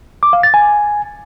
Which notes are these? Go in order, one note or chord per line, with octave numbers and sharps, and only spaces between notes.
D6
F5
A6
G#5